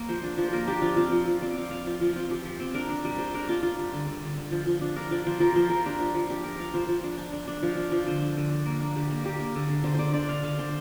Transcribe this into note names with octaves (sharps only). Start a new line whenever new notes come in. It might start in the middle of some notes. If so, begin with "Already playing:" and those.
Already playing: A#3
F3 C5
D4
F3
C5
A#3 A#4
D4 G4
F3 F4
C4 F4
F3
F3
C4 D5
F3 F5
C4 F5
F3 F5
F3 F4
C4 F4
F3 G4
F3
C4
D4 A#4
D4
G3
G3 C5
D4 A#4
D4 F4
D4 F4
G3
D3
D3
D3
D3
F3
F3
D4
D4 A#4
F3 D5
F3 C5
F3 A#4
F3 C5
F3 A#4
D4 G4
F3
F3
D4 G4
D4 A#4
F3 F5
F3 C5
F3
D4
D4
D4
D4
F3 F5
D4
F3
D3 C5
D4
D3
D4
A#3
D4
D3 G4
A#3 A#4
D3 G4
A#3
D3
D3
D3 C5
D3 C5 D5
D4 D5
D3 F5
D3 F5
D3 C5